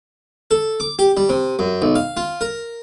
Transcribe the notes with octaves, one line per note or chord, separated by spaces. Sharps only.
A4
D6
G4
G3
C3
F#2
B1
F5
F4
A#4